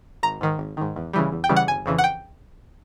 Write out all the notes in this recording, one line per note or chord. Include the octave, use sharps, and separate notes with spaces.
G#1 A#5
G#2 D#3
G#1
G#2 D#3
E2
C#3 E3 G3
E2
G5
C#3 E3 G3
F#5
G1 G#5
F2 C#3 E3
F#5
G5